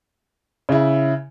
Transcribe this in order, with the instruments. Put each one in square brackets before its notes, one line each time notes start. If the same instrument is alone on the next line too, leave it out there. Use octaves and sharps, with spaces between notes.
[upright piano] C#3 E4